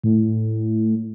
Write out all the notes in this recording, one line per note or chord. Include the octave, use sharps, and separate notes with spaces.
A2